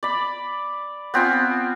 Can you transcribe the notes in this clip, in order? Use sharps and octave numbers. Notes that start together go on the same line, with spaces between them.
D5 B5
B3 C4 F4 G#5